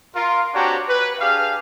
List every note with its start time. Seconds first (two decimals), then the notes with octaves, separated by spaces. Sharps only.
0.15 F4 A#4
0.54 C4 D4 F#4 G4 C#5 A#5
0.89 B4
1.20 D4 G4 G#4 F5